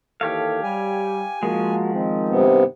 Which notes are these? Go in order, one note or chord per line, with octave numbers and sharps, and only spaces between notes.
D#2 E3 G4 A4 C#5 F5
G3 G#5
F3 G#3 A#3 F#4
D#3 C4
G2 C3 B3